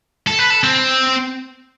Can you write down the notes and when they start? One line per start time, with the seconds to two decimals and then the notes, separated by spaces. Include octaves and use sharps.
0.27 A4
0.39 B4
0.50 A4
0.64 C4